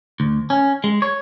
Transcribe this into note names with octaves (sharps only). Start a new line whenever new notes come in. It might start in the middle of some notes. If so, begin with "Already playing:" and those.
D2
C#4
G#3
C#5